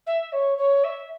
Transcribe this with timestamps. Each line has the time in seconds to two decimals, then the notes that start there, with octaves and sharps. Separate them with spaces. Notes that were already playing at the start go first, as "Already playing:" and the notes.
0.06 E5
0.32 C#5
0.58 C#5
0.84 E5